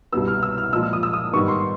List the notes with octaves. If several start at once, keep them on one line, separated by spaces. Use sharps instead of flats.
C2 B2 G3 B3 E6
F6
E6
F6
A#2 F3 G#3 E6
E6
D#6
E6
D#6
G#2 D#3 G3 B3 C#6
C6